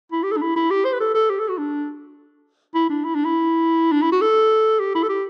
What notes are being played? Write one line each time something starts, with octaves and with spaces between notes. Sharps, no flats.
E4
G4
A4
D4
E4
E4
G4
C5
B4
A4
A4
G4
A4
F#4
D4
E4
D4
E4
D4
E4
D4
E4
F#4
A4
G4
E4
A4
G4